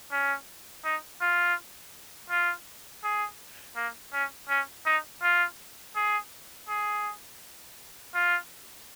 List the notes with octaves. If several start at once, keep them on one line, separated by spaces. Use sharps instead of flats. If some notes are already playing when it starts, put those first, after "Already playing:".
C#4
D#4
F4
F4
G#4
A#3
C#4
C#4
D#4
F4
G#4
G#4
F4